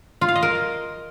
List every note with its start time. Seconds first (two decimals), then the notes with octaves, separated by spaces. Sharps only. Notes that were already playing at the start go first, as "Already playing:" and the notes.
0.21 F4
0.28 F5
0.35 D#5
0.43 A#4